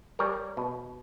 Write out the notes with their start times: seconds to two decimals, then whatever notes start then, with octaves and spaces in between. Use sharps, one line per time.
0.19 G3 A#4 C#5
0.57 B2